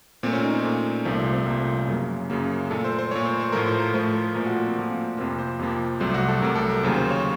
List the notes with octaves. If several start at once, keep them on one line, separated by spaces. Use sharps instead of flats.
A#2 A3 C4
C#4
D#4
C4
A#2 A3
C2 C3 F3 A3 A#3
C4
C4
C2 C3 F3 A3 A#3
C4
C#4
F#2 C#3 F#3 A#3
F#2 C#3 F#3 A#3
A#2 A3 A4
C5
C5
A#2 A3 C#5
C5
C5
A2 F3 A3 A#4
C5
A#4
A2 F3 A3 C5
A#4
A#2 F3 A3 A#4
F#4
A#3
C4
A#2 F3 A3 A#3
C4
F2 C3 F3 A#3 F4
C5
F2 C3 F3 A#3
C2 C3 F#3 A3 C5
F#4
A4
C2 C3 F#3 A3 A#4
A4
A#4
D#2 C#3 F#3 A#3 C5
C5
C#5